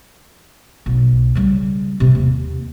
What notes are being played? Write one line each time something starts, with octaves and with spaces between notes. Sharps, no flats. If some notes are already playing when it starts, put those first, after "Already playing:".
B1
C#3 G3
C3 C4
D#2